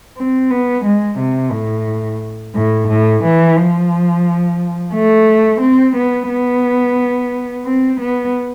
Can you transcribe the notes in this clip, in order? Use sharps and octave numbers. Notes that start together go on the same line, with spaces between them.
C4
B3
G#3
C3
A2
A2
A2
E3
F3
A3
C4
B3
B3
C4
B3